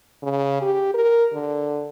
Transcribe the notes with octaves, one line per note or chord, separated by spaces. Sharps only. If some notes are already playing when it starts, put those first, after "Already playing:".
C#3
G4
A#4
D3